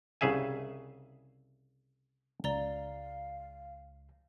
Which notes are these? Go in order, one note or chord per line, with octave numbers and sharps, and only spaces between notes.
C2 C#3 G#4 E5 G#5
C#2 D5 F5 A#5 G7